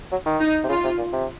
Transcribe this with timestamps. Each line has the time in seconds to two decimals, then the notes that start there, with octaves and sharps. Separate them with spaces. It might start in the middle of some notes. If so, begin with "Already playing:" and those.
0.11 F#3
0.25 D#3
0.40 D#4
0.64 C3
0.68 C#3 F4
0.84 C3
0.98 A#2
1.12 C3